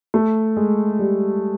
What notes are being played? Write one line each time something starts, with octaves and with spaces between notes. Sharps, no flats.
A3
G#3
G3